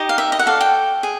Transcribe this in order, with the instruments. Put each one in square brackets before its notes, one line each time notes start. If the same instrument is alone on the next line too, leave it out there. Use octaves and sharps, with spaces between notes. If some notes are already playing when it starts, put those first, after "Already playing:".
Already playing: [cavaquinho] D#4 G4 D#5
F5
E5
D#5
F#5
F#4 A4 D5 F5
G5
G#4